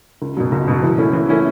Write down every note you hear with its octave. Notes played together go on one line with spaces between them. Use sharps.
C#2
B2 F#3
C#2
B2 F#3
E3
A3 C#4 E4
E3
A3 C#4 E4